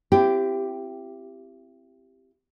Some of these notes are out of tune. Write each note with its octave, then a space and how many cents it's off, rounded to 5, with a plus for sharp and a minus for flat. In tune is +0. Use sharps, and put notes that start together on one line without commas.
C4 +0 E4 +40 G4 +0